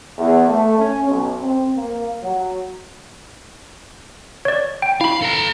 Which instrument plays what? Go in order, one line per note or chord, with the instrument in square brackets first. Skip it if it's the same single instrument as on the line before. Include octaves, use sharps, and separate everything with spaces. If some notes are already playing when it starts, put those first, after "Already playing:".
[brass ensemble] E2
A3
C#4
B1
C4
A#3
F#3
[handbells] C#5 D5
G5
[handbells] E4 B5 [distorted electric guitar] F5
[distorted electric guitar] A4 A#5